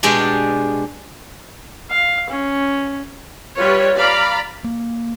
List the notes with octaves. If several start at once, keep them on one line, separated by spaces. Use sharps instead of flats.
B2 G#3 D4 G4 D5
F5
C#4
G3 F4 B4 C#5
D5 F5 A#5 B5
A#3